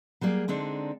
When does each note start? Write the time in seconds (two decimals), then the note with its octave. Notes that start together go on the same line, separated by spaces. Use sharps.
0.21 F#3 G3 A#3 G#4
0.48 D3 G#3 C4 D4 D#4